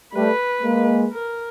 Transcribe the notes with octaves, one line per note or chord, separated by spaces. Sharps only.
G3 A3 B4
G#3 A#3
A#4